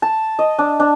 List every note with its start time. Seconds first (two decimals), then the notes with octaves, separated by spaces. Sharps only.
0.02 A5
0.39 D#5
0.59 D4
0.80 D4